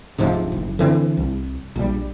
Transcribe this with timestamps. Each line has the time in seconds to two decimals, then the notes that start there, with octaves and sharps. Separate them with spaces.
0.18 D1 G#2 C3 F3
0.52 F#1
0.79 D3 E3 C4
1.17 C2
1.76 A#1 G3